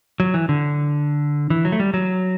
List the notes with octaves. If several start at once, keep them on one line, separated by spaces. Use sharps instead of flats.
F#3
E3
D3
E3
F#3
A3
G3
F#3